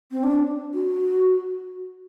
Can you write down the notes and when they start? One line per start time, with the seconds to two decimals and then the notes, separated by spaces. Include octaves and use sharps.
0.12 C4
0.24 D4
0.74 F#4